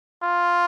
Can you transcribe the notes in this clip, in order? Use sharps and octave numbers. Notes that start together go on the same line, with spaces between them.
F4